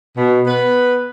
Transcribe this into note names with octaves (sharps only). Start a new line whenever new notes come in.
B2
B3 B4